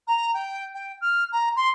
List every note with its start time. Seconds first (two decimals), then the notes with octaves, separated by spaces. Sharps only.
0.07 A#5
0.34 G5
0.74 G5
1.01 F6
1.32 A#5
1.56 C6